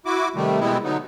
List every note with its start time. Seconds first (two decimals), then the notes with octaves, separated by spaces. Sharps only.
0.06 E4 F#4 D6
0.35 C3 D#3 G3 A3
0.60 B2 G3 G#3 B3 C4 E4
0.84 D3 F#3 B3 D#4